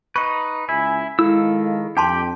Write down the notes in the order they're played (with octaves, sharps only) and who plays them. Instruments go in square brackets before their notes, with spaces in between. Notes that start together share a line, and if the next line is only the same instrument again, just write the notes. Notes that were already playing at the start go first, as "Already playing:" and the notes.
[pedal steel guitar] D#4 B4 [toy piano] C#6
[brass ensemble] C#2 G#5 [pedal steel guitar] E4
[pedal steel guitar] D#3 E6 [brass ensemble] G#3 A4 F5 [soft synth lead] E4
[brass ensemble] F2 [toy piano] D4 A5 C6 [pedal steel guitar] G4